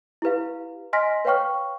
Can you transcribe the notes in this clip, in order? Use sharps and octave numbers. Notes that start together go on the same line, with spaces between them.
E4 G4 B4 F5
D#5 G#5 C6 F6 A#6 B6
B4 C#5 F5 G5 C#6 F6